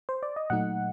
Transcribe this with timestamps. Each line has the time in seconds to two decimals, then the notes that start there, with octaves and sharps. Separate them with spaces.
0.09 C5
0.23 D5
0.36 D#5
0.50 A#2 F#3 A3 D#4 F#5